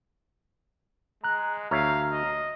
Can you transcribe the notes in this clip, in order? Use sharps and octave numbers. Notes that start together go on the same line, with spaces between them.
G#3 A#5 F#6
D2 C#5 E5 F5 A#5 F6
D#5